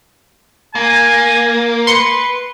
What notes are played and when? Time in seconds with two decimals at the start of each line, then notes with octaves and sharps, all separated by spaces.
0.75 A#3 G#5
1.87 B4 C6 C#7